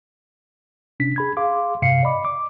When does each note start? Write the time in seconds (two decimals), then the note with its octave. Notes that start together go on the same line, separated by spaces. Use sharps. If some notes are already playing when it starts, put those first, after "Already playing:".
1.00 C3 C#4 D4 B6
1.16 G#4 B5 G#6
1.37 G#4 F5 C6 D6
1.82 G2 C3 F5 C7 C#7
2.03 D5 D#5 B5 D6
2.25 D6